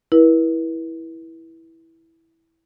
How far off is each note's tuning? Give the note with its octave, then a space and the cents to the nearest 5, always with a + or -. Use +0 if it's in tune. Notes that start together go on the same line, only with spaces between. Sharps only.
E4 -10 B4 -45